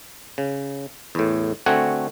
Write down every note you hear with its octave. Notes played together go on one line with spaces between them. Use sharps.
C#3
E2 A2
D3 A3 C4 F#4 F#5 G#5